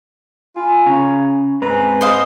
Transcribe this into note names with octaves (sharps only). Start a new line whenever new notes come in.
F4 G#5 B5
C#3 C#4 A#5
G#2 G#3 C4 B4 A#5
C5 D#5 F5